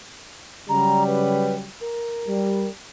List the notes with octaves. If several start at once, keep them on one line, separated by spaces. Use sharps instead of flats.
C#3 F#3 G3 A#5
B4
A#4
G3